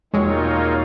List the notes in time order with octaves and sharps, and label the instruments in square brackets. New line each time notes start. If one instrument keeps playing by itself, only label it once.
[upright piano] E1 [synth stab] G#3 [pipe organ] A#3 D#4 F4 [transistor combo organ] C#5